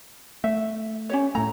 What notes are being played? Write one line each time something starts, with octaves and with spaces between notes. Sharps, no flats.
A3 E5
C#4 G4 C#5
A2 A3 A#5